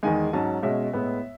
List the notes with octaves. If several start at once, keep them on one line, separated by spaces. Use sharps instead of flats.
E2 D#3 G#3 G#5
G#2 F#3 C#4 A5
B2 G#3 C#4 E5
A2 G#3 B3